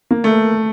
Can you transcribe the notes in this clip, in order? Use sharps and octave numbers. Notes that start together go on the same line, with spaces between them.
A#3
A3